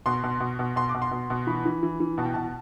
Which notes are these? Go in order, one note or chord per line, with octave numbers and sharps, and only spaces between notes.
B2 C6
B2
B2
B2
B2 C6
D6
B2
C6
B2
B2
E3 B5
E3
E3
E3
B2 A5
G5
B2 A5